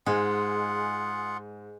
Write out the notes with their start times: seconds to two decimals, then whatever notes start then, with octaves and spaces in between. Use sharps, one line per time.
0.06 G#2 G#3 F4 G#4 F#5